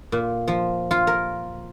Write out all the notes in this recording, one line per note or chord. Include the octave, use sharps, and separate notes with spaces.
A#2
F3
F4
A#4